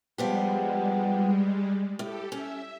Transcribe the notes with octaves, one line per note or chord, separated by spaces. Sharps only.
F3 G3 G#3 B3 G4
A2 G4 A4
C#4 E5